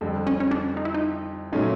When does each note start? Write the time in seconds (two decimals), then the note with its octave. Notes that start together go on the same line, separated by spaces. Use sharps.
0.01 F2 D3 G3
0.27 C#4
0.40 C#4
0.51 D4
0.77 D#4
0.85 E4
0.94 D#4
1.52 A#2 F#3 A3 C#4 D#4 F4